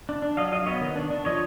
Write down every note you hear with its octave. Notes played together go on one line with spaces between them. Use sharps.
D4
D4
F#3 D#5 F5
F#3 D#5 F5
B3 C#5 D#5
D#3
D4
D4
F3 C#5 D#5